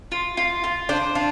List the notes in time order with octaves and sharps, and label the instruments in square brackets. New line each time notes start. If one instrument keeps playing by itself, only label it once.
[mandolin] F4
F4
F4
[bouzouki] D4 [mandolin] C5
[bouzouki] D4 [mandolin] F4